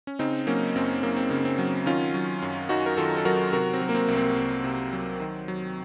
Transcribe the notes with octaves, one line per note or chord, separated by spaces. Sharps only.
C#4
C#3 C4 D#4
F#3 A#3 C#4
F#2 C4
F#2 A#3
C4
C#3 A#3
C4
F#3
D#3 C#4 F4
F#3
F#2
F#2 D#4 F#4
A#4
D#3 F4 A4
A4
F#3 F#4 A#4
C3 F#4 A#4
C4
F#3
A#3
C4
C2
C4
C2
C3
F#3
D#3
F#3